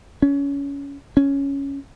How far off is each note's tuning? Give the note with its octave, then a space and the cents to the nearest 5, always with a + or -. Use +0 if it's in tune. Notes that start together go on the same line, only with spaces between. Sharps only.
C#4 +25
C#4 +5